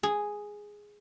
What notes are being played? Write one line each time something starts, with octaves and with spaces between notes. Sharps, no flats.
G#4